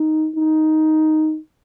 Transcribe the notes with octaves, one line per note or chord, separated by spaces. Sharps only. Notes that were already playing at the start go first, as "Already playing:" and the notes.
Already playing: D#4
D#4